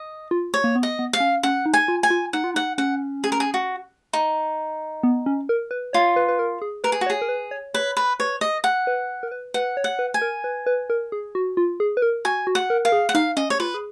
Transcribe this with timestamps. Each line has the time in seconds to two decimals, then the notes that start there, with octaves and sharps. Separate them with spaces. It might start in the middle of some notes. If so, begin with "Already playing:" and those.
Already playing: D#5
0.31 F4
0.54 C#5
0.64 A#3
0.76 B3
0.83 D#5
0.99 B3
1.13 F5
1.20 C#4
1.43 C#4 F#5
1.66 D#4
1.74 G#5
1.88 F4
2.03 G#5
2.10 F4
2.33 D#4 F#5
2.44 F4
2.54 D#4 F#5
2.78 C#4 F#5
3.24 G#4
3.32 A#4
3.40 G#4
3.54 F#4
4.13 D#4
5.03 B3
5.26 C#4
5.49 A#4
5.71 B4
5.93 F4 C#5
6.16 B4
6.28 B4
6.39 A#4
6.62 G#4
6.84 A#4 B4
6.92 G#4
7.01 F#4
7.06 C#5
7.10 G#4
7.22 A#4
7.29 B4
7.51 C#5
7.74 B4 C#5
7.97 B4
8.20 B4 C#5
8.41 D#5
8.64 F#5
8.87 B4
9.23 A#4
9.31 B4
9.54 B4 F#5
9.77 C#5
9.84 F#5
9.99 B4
10.14 G#5
10.22 A#4
10.44 B4
10.66 B4
10.90 A#4
11.12 G#4
11.35 F#4
11.57 F4
11.80 G#4
11.97 B4
12.02 A#4
12.25 F#4 G#5
12.47 F#4
12.55 F#5
12.70 A#4
12.85 A#4 F5
12.92 G#4
13.09 F#5
13.15 D#4 F5
13.37 C#4 D#5
13.50 C#5
13.60 F4 B4
13.74 G#4